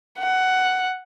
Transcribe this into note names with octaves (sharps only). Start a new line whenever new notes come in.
F#5